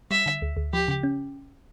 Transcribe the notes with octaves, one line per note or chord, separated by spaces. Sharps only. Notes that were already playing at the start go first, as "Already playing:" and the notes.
G3 E5
D3
D2
D2
F3 G4
C#3
C#4